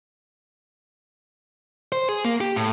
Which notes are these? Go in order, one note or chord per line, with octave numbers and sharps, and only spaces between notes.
C5
G#4
A#3
G4
A2